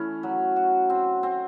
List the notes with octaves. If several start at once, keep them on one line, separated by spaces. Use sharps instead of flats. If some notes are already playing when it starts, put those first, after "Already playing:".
Already playing: E3 A3 C#4
F#3
F#4
C4
C4